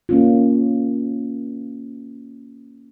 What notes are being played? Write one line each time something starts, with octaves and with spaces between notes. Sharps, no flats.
A#3 C#4 F4